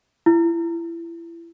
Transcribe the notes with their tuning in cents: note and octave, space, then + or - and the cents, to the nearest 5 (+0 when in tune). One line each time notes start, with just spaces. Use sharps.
E4 +30